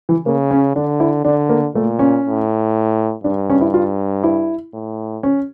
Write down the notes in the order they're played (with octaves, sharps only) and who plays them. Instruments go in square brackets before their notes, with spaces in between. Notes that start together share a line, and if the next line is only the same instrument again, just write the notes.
[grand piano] E3
[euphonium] C#3 [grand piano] A#3
[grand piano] C#4
[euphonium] D3 [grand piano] D4
[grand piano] E4
[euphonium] D3 [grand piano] D4
[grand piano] A#3
[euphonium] A#2 [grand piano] A3
[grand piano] C#4
[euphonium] A2
[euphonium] G2 [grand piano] D4
[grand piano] C#4
E4
F4
E4
[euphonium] A2
[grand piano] C#4